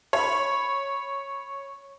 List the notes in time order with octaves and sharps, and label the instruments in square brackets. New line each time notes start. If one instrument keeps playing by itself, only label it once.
[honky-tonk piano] C#5 B5